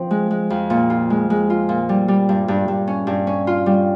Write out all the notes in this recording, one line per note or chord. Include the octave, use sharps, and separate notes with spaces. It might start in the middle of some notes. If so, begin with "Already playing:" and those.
Already playing: F3 C4
G#3
G#3
F2
A#2
F4
G#3
G#3
F4
A#2
G3
G3
G2
G2
G2
C#4
G2
C#4
F4
G3